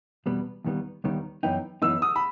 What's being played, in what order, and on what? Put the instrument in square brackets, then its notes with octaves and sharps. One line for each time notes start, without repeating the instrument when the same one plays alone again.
[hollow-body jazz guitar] E2 B2 G3 B3
D#2 D#3 G3 B3
D#2 D#3 G3 B3
[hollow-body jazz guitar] F#2 E3 B3 D#4 [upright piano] G5
[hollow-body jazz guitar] F#2 E3 B3 D#4 [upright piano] E6
[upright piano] D#6
B5